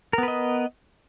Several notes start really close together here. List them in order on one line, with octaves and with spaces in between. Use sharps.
A#4 B3 B4 D#5